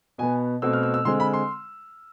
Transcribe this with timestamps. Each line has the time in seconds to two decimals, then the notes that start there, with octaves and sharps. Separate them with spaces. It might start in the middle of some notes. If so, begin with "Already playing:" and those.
0.18 B2 B3 G#5
0.62 B2 A3 C4 E6
0.73 F6
0.83 E6
0.94 E6
1.05 D3 G#3 C4 C6
1.20 B5
1.33 C6